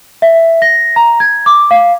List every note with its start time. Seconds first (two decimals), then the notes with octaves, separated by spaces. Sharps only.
0.22 E5
0.62 A#6
0.96 A#5
1.20 G#6
1.46 D6
1.71 F5